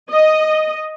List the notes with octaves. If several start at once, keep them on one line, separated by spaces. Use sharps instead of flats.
D#5